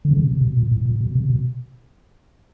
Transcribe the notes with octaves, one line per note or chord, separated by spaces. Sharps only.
D3
C#3
C3
B2
A#2
A2
A#2
B2
C3
B2